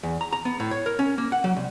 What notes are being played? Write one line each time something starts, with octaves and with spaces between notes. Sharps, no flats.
E2
A#5
A#5
B3
A2
C#5
A#4
C#4
A#3
F#5
F#3
C2